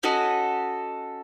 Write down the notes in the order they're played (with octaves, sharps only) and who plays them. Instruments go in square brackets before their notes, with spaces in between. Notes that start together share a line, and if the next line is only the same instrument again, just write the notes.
[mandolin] C#4 F#4 A4 D#5